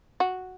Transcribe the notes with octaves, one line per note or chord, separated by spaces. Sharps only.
F#4